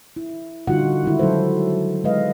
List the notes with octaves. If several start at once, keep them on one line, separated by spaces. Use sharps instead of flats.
E4
D3 G3 D#4 F4 F#4 F#5
D#3 G#3 E4
F#3 C#4 A4 C5
G#3 B4 D#5 F5